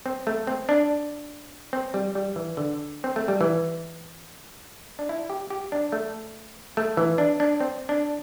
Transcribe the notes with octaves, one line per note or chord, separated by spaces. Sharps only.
C4
A3
C4
D4
C4
G3
G3
E3
D3
C4
A3
G3
E3
D4
E4
G4
G4
D4
A3
A3
E3
D4
D4
C4
D4